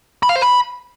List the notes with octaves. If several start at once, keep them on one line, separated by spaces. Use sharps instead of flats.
B5
F5
C5
B5